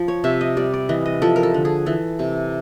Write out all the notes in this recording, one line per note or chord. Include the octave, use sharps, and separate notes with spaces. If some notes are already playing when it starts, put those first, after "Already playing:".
Already playing: F3
C#5
C3 E5
D#5
G3 D5
D5
E3 D#5
D#5
F3 A4
A#4
A4
D3
G#4
E3 A4
C3